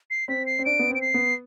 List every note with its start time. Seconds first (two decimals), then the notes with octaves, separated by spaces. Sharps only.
0.10 C7
0.28 C4 B6
0.46 C7
0.59 C4
0.65 D4 D7
0.79 B3
0.90 C4 D7
1.01 C7
1.14 B3